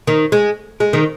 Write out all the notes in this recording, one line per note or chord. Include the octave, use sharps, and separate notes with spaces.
D#3
G#3
G#3
D#3